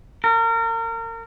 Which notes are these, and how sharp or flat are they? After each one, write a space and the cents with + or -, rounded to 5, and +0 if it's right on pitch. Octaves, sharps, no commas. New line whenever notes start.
A#4 -30